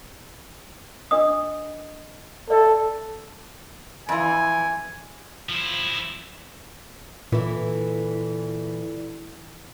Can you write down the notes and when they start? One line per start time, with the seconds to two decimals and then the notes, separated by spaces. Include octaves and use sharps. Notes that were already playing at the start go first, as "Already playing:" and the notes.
1.11 D4 D#5 D#6
2.50 A4 D5 E5
4.09 F2 E3 G#5
5.49 F3 E4
7.32 A#2 D3 E3 E4